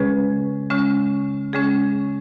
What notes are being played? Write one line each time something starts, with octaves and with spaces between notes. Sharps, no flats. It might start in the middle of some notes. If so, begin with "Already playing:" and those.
Already playing: C#3 G#3 C#4 G#4 B4
C#3 G#3 C#4
C#3 G#3 C#4 G#4